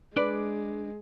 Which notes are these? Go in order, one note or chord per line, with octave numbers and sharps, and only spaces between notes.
G#3 D4 B4 D5